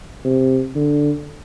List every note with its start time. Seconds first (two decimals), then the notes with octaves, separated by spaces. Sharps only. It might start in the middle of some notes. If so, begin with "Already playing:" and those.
0.25 C3
0.75 D3